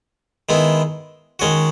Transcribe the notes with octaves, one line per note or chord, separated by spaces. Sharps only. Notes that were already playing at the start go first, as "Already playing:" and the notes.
D#3 G#3 B3 E4
D#3 G#3 C#4 F#4